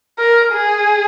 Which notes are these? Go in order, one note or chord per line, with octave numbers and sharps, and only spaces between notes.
A#4
G#4